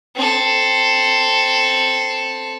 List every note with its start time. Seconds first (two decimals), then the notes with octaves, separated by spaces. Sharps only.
0.16 C4 A4